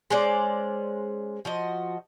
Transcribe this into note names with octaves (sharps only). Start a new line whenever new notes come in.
G#3 C#4 C5 D5
F3 F#4 D#5